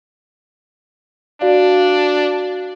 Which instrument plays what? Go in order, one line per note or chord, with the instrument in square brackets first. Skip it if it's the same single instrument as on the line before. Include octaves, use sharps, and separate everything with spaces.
[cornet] D4 [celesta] F#4 D5 F5